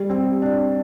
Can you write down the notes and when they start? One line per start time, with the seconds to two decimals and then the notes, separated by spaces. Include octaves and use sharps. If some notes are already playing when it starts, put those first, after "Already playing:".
Already playing: G3
0.10 C4
0.42 D4